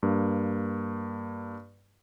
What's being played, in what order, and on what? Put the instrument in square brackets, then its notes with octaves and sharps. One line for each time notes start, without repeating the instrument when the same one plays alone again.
[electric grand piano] G2 A#3